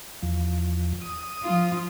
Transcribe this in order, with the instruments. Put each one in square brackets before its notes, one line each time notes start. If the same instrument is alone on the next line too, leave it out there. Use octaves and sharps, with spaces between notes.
[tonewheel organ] E2 F3
D#6
[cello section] F3 F4